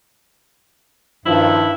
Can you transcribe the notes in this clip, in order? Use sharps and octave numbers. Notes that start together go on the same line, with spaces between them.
G2 D#3 F3 E4